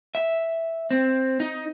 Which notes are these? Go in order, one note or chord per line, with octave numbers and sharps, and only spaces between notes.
E5
C4
D#4